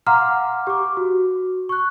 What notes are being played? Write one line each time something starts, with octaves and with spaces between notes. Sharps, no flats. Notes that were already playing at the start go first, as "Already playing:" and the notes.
F5 F#5 A#5 C6 D6 F6
G4 D6
F#4
C#6 F#6